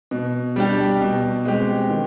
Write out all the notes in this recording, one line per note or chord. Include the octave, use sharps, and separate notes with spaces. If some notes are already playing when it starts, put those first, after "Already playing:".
B2
G3 D4 G4
B2
G#3 C4 G4
D#3